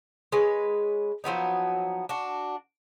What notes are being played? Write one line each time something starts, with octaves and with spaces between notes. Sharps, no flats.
G#3 B4 C#5
F3 F#3 B3 D#4
D4 F#4